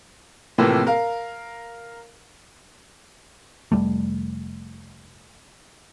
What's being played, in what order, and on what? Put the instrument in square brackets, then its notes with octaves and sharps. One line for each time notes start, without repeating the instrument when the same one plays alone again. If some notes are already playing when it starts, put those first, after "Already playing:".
[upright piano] A2 C3 E3 F3 A#3
A#4 F5
[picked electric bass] F1 G#2 G3 A3